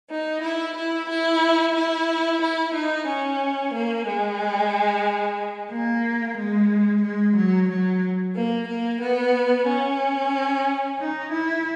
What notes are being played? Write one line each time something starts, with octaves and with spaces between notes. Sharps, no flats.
D#4
E4
E4
E4
E4
E4
D#4
C#4
A#3
G#3
A#3
G#3
G#3
F#3
F#3
A#3
A#3
B3
C#4
D#4
E4